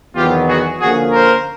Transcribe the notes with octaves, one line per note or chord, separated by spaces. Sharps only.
E2 C3 D#3 F#3 B3 F4 G4
F#4 G#4
D3 F3 A#3 C#4 F#4 G#4
A#4 C5